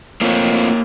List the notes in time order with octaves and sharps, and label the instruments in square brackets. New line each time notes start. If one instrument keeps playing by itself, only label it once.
[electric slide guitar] A3 C4 F4 [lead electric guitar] A#3 C#5